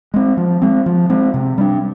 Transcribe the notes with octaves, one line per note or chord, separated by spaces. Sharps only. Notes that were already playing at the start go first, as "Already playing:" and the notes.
G#3 C4
F3
G#3 C4
F3
G#3 C4
C3
G3 D4